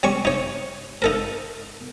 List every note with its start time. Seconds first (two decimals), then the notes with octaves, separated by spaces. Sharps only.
0.03 G3 C#4 C#6
0.25 D#4 C#5
1.02 D#4 A4 A#4